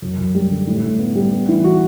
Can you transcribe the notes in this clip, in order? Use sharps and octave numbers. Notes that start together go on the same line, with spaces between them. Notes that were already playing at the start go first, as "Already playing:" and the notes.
F#2
F#2
G3
D3
A2
A2
B3
G3
B3
E3
F#4